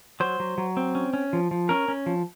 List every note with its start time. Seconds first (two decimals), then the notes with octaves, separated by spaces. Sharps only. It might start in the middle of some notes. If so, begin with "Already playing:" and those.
0.20 F#3 C5
0.40 F#3
0.58 F#3
0.77 C4
0.95 C#4
1.14 C#4
1.33 F3
1.51 F3
1.69 C#4 A#4
1.88 C#4
2.06 F3